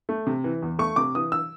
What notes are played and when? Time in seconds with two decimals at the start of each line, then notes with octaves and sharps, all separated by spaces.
0.09 A3
0.27 C3
0.44 E3
0.62 E2
0.79 A3 C#6
0.96 C3 D6
1.15 E3 D#6
1.32 E6